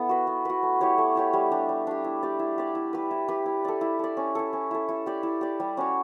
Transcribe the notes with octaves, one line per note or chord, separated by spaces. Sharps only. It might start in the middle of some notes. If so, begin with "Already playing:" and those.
Already playing: B3 E4 A4
F#4 B4
B3
F#4 B4
A3
E4 G4 C#5
A3
E4 G4 C#5
G3
D4 G4
G3
D4 G4
E4
G4 D5
E4
G4 D5
E4
G4 B4
E4
G4 B4
E4
A4 D5
E4
A4 D5
C#4
E4 A4
C#4
E4 A4
E4
G4 D5
E4
G4 D5
G3
C#4 F#4 C#5